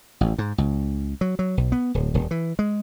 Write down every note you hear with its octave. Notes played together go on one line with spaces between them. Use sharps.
A1
G#2
C#2
F#3
F#3
B1
B3
D1
D#1
E3
G#3